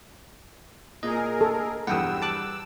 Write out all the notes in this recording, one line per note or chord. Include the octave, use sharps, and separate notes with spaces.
A#2 G#4 A#4 D#5
A4
B1 E2 G2 F#5 G5 D#6 E6
A5 D6 F#6